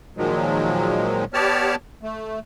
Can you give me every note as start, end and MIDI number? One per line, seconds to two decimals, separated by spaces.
0.17 1.24 46
0.17 1.24 51
0.17 1.24 53
0.17 1.24 54
0.17 1.24 56
1.34 1.75 59
1.34 1.75 67
1.34 1.75 73
1.34 1.75 74
1.34 1.75 81
1.34 1.75 89
2.03 2.39 57